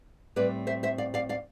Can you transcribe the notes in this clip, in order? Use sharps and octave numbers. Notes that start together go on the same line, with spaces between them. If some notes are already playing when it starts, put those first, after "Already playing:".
A2 G3 C4 B4 D5
C5 E5
C5 E5
D5 F5
D5 F5
D5 F5